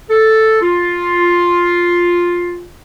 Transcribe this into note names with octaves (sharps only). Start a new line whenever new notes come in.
A4
F4